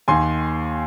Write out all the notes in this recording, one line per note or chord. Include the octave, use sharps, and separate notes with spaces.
D#2 D#3 G#5 C6